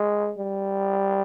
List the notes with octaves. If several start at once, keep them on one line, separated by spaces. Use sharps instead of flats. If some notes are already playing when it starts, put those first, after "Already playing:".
Already playing: G#3
G3